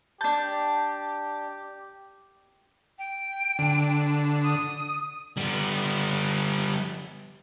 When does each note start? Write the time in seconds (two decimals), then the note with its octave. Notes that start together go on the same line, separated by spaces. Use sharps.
0.21 D4 G4 A5 G6
2.99 G5
3.59 D3
4.43 D#6
5.37 G3 B3